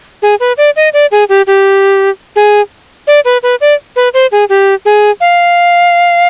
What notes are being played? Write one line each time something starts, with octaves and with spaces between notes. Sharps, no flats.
G#4
B4
D5
D#5
D5
G#4
G4
G4
G#4
D5
B4
B4
D5
B4
C5
G#4
G4
G#4
F5